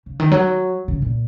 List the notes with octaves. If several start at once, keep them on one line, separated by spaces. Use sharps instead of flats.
C#3
D#3
F#3
C#3
A#2